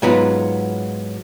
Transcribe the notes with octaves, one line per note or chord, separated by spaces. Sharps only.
G#2 F#3 B3 F4